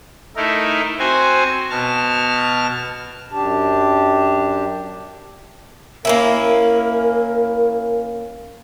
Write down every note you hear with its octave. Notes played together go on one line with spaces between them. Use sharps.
A3 D#4 E4 A#4
C4 F#4 C5 G#5
B2 A5 F6
F#2 D4 G4 A5
A#3 C#4 E4 A#4